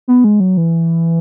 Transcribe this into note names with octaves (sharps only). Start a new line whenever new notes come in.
B3
G#3
F#3
E3